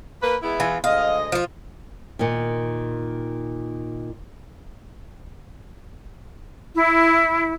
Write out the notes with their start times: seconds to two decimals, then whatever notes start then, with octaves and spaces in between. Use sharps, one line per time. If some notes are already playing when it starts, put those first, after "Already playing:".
0.22 A#3 B4
0.43 G#3 B3 E4
0.60 E3 F4
0.84 D2 G#3 D#5 F5
1.32 F3 F4
2.19 A#2 D#3
6.75 E4